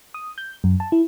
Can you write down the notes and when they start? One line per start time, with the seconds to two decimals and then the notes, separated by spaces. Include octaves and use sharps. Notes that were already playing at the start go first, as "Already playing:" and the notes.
0.14 D#6
0.38 G6
0.64 F#2
0.80 A5
0.92 E4